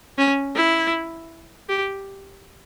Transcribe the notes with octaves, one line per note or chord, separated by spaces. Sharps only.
C#4
E4
G4